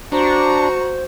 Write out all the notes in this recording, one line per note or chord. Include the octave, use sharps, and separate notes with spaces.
D4 F#4 C5 A#5 C#6